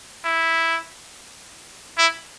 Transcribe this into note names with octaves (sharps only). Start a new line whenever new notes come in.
E4
E4